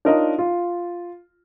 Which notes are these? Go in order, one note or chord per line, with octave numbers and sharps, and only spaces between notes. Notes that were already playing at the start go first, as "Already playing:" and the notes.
D4 D#4 F4 A#4 C#5 D#5
F4